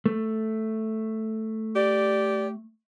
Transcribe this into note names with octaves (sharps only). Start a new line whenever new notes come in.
A3
G4 D5